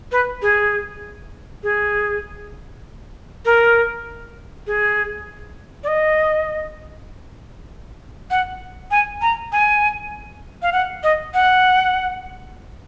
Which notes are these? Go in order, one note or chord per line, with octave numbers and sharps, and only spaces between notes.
B4
G#4
G#4
A#4
G#4
D5
D#5
F#5
G#5
A#5
G#5
F5
F#5
D#5
F#5